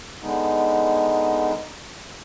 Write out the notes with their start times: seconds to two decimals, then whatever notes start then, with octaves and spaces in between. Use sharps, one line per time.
0.23 D3 G#3 B3 D#4